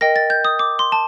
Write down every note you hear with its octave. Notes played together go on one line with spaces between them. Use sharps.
A#4 D#5 G5 A#6
A6
G6
D#6
D6
C6
A5